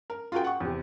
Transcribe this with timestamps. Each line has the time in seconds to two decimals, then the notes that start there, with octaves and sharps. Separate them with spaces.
0.10 A#4
0.32 F4 F#4 G#4 A#4 G5
0.44 F#5 C#6
0.60 E2 C3